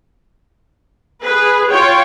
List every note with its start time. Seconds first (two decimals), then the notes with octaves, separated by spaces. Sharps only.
1.23 G#4 B4
1.71 F4 C#5 G5